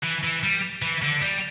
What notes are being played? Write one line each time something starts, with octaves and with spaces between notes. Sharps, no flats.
E3
E3
G3
E3
D3
G3